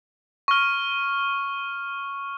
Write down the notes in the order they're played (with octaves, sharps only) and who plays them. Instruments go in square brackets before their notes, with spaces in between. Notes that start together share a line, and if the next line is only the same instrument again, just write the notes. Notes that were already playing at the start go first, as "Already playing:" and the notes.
[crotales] C#6 F6